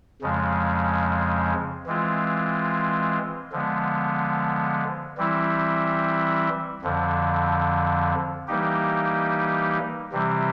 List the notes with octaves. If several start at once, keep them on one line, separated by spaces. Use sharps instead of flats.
F2 C#3 F3 G#3
E3 G#3 C4 F4
D3 F3 G#3 B3
E3 G3 C4 E4
F2 D3 F3
E3 G3 A#3 D#4 G4
C3 E3 G3 C4